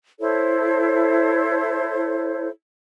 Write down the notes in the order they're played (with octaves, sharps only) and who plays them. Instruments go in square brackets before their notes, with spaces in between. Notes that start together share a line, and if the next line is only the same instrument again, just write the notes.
[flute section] E4 A4 C5 C#5